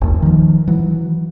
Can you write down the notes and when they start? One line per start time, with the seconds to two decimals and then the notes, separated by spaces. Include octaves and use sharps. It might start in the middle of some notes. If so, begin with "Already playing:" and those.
0.01 F#1 D#2
0.22 D#3 F3
0.68 E3 F#3